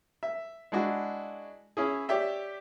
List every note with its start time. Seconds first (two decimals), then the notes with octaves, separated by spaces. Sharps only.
0.23 E5
0.72 G#3 D4 E4 F#4
1.77 C#4 E4 G#4
2.09 G4 C#5 D5 E5 G5